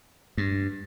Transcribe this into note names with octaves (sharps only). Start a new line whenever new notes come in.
G2